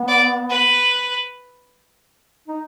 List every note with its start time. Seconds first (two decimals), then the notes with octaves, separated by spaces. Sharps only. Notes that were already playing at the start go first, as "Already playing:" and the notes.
Already playing: B3
0.08 D5
0.50 B4
2.48 D#4